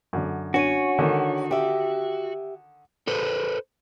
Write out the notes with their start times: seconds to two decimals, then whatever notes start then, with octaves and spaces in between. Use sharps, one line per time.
0.13 F#2 D3
0.54 C#4 D4 F#4 C#5 F#5 D#7
0.99 D3 D#3
1.51 G4 E5
3.07 A4 B4 C5